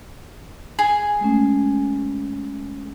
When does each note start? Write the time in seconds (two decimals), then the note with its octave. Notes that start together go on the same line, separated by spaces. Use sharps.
0.79 G#4
1.21 G#3 A3 C#4